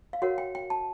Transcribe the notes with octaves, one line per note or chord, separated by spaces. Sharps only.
F5
F#4 A#4 C#5 F#5
G5
G5
A5